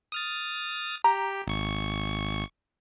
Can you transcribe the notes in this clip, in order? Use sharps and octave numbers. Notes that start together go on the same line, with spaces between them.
D#6 F6 A6
G4 A#5
G#1 C#6